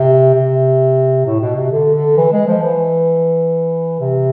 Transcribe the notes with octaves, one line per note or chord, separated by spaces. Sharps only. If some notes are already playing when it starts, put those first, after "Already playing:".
Already playing: C3
C3
A2
B2
C3
D3
D3
E3
G#3
F3
E3
C3